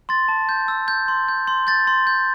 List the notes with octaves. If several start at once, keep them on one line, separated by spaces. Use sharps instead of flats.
C6 A6
A5
G6
E6
G6
C6
G6
C6
G6 A6
C6
G6